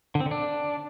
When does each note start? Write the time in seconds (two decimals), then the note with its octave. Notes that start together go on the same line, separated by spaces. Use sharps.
0.15 D3
0.20 C4
0.26 D3
0.31 D4